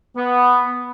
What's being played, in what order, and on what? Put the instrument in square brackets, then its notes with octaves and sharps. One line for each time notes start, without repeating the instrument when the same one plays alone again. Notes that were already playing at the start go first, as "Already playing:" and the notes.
[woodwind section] B3